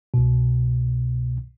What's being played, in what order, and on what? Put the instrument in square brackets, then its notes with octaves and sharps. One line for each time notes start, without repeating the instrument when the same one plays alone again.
[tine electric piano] C2 B2